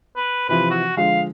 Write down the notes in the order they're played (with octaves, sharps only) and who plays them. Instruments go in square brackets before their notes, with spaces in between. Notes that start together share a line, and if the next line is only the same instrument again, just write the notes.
[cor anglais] B4
[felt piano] C3 E3 F3 [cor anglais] B4
[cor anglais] F#4
[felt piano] D3 F3 G#3 [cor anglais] F5